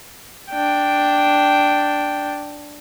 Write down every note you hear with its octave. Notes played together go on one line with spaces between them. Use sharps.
D4 G5